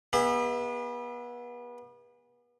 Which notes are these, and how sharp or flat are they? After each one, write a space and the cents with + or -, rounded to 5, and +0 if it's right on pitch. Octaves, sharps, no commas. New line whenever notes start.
B3 -30 G#4 -45 E5 -5